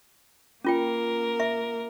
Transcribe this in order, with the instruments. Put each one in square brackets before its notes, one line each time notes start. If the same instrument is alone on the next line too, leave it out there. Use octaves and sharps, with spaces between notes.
[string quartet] A#3 A#4 [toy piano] C#4 F4 G5
[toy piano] E5